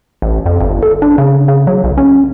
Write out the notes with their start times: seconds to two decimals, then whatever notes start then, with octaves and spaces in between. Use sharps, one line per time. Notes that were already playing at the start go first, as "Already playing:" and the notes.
0.22 A1
0.46 F2
0.60 G1
0.83 A4
1.02 D4
1.18 C#3
1.48 C#3
1.67 F#3
1.84 B1
1.97 C#4